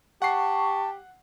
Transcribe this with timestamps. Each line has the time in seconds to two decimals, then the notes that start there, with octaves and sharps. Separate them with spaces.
0.22 G4 F#5 A5 C#6 C7